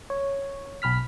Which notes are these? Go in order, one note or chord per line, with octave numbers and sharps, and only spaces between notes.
C#5
B1 B5 F6 B6